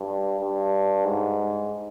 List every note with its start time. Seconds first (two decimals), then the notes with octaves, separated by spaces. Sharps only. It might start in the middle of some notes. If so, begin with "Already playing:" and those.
Already playing: G2
0.40 G2
1.05 G#2